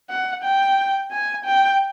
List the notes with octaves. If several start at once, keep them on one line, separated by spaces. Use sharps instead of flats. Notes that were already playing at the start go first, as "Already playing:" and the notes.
F#5
G5
G#5
G5